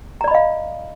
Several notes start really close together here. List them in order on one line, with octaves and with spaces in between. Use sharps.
A#5 D5 B5 D#5 F5